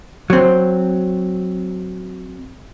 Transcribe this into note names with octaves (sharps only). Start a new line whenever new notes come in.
F#3 C4